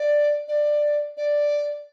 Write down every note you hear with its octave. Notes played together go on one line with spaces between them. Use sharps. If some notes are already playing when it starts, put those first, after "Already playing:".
Already playing: D5
D5
D5